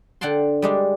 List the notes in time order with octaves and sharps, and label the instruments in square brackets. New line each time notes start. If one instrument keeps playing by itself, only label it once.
[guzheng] D3 F#5 G5 A5 C6
G3 G#3 D4